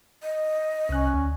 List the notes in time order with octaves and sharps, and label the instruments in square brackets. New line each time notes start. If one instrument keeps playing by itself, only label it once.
[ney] D#5
[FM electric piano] C2 F#6 [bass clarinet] C#4
[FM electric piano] D2